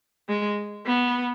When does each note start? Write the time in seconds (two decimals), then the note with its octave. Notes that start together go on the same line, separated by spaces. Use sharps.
0.29 G#3
0.86 B3